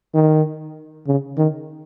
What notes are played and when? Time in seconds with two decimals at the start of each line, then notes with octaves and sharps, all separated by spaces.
0.15 D#3
1.08 C#3
1.38 D#3